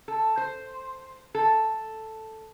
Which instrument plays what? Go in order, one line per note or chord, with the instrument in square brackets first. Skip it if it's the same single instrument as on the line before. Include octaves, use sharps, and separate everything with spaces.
[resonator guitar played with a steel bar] A4
C5
A4